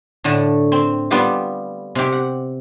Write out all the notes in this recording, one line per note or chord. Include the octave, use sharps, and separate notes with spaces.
A2 D3 A3
C4
G3 B3 F4 G4 F5
C3 G4
F#5